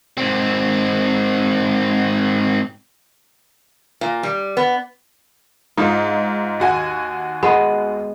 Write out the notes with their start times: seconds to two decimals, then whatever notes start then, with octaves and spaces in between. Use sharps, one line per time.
0.18 G#2 C4
4.01 A#2
4.23 G3
4.57 B3
5.77 G#2 D#4 F4
6.60 D#2 F#4 G#5
7.43 G#3 B3